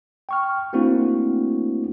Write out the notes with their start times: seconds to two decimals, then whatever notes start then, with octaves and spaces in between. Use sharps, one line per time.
0.29 G5 C#6 F6
0.73 A3 A#3 C4 D4 E4 F#4